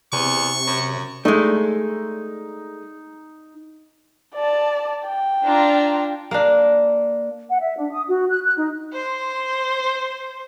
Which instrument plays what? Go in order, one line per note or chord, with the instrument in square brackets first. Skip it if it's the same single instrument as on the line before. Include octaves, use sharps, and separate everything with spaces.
[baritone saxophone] E2 [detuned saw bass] C3 [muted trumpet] C#6
[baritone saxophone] F#2
[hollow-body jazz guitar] G#3 A3 [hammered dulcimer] D#4
[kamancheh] D5 A5
G5
[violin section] D4 F4 A#5
[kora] A#3 D4
[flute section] F#5
E5
D4
D#6
F#4
F#6
F#6
D#4
[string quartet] C5 C6